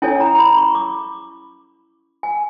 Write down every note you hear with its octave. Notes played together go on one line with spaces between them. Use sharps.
C#4 E4 A4 C#5 G#5
A#5
A#5
B5
C#6
D6
G#5